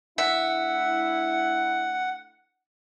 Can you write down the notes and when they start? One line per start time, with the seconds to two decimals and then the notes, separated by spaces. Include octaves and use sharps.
0.18 A3 D4 E4 E5 F#5